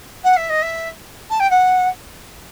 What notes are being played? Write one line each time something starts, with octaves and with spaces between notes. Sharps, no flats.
F#5
E5
D#5
E5
A5
G5
F#5